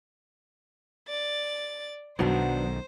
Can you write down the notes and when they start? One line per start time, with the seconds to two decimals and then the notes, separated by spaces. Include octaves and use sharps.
1.09 D5 A6
2.19 B1 B2 D#3 F#3 B3 D4 C5